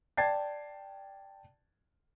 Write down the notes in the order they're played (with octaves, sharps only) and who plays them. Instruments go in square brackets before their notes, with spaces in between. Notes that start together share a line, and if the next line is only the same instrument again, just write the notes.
[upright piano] D5 G5 A5 G#6 A6 C7